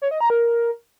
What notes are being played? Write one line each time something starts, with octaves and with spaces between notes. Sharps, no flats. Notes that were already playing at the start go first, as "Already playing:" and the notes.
C#5
D#5
A#5
A#4